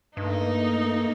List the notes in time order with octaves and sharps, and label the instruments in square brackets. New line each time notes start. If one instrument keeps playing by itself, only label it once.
[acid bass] G2 [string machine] A3 A#3 [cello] D#4